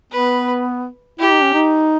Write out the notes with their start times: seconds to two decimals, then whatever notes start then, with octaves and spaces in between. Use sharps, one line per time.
0.12 B3 B4
1.19 E4 G4
1.31 D#4
1.43 C#4
1.53 D#4